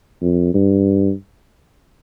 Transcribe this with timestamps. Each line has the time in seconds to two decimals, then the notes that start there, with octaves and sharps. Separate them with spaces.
0.21 F2
0.54 G2